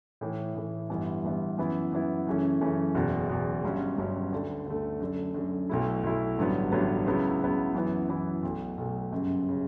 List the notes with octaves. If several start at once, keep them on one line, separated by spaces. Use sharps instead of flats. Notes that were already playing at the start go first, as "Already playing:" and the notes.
A2 E3 A3
A2 E3 A3
G1 G2 E3 B3
G1 G2 E3 B3
F#2 E3 B3 E4
F#2 E3 B3 E4
F#2 C#3 E3 A3 C#4
F#2 C#3 E3 A3 C#4
F#1 E2 B2
F#1 E2 B2
G1 G2 F#3 C#4
G1 G2 F#3 C#4
D2 D3 A3
D2 D3 A3
F#2 D3 A3
F#2 D3 A3
B1 B2 A3 E4
B1 B2 A3 E4
A1 G2 D3 F#3 B3
A1 G2 D3 F#3 B3
C#2 C#3 F#3 B3 E4
C#2 C#3 F#3 B3 E4
F#2 E3 B3 E4
F#2 E3 B3 E4
B1 B2 A3
B1 B2 A3
G1 F#2 C#3
C#3